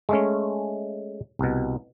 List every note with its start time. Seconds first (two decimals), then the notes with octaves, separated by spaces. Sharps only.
0.09 G#3 A3 C#4
1.39 C2 B2